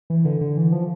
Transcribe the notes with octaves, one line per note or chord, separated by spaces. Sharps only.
E3
D3
D3
E3
F3